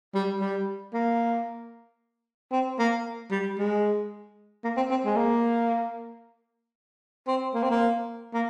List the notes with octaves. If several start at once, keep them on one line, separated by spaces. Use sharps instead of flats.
G3
G3
A#3
C4
A#3
G3
G#3
A#3
C4
C4
G#3
A#3
C4
A#3
C4
A#3
A#3